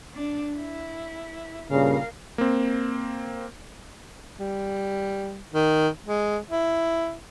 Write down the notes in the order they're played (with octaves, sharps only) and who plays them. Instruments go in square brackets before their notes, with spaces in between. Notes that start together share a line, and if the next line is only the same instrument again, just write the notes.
[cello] D4
E4
[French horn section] G2 A#2 C#3 [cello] A#4 F5
[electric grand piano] A#3 C4
[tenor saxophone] G3
D#3
G#3
E4